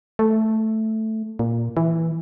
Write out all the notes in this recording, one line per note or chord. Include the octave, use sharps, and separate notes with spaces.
A3
A#2
E3